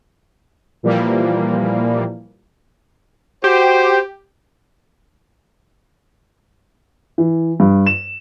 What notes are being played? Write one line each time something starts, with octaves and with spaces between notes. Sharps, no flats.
A#2 E3 F3 G3 A#3
F#4 G4 C5
E3
G2
E7